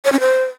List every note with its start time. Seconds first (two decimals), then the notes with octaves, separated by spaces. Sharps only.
0.05 C#5
0.12 C#4
0.20 C5